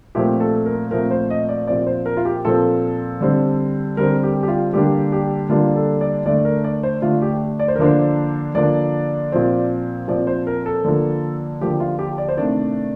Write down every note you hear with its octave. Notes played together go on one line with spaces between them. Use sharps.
A#2 F3 A3 C4 G4
A4
A#4
A#2 F3 A3 C4 A#4
C5
D#5
D5
A#2 F3 C4 D5
C5
A#4
F4
G4
A#2 F3 C4 A4
D3 G3 C4
D3 G3 C4 A#4
G4
G4
F4
D3 G3 A#3 D4 G4
G4
D3 G3 A#3 D4 F4
A4
D5
D3 A3 D4 D5
A#4
D5
C5
D3 A3 D4 F4
G4
D5
C5
A#4
D3 F3 A#3 D4 C5
D3 F3 A#3 D4 D5
A#2 F3 C4
A#2 F3 C4 D5
C5
A#4
A4
D3 F3 A#3
D3 F3 A#3 G4
F4
G4
D5
C5
C3 D#3 A3 D4 D5